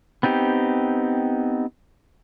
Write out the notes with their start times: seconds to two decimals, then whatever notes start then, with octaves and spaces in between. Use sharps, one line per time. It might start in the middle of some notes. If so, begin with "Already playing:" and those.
0.23 B3 C4 D#4 G4